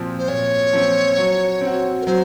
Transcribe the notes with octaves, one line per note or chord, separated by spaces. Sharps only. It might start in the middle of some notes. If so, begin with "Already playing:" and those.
Already playing: A#2 F3 C4
C5
A#2 C#5
F3 C4
F#3
C4
F#4
A#4
F#3 C5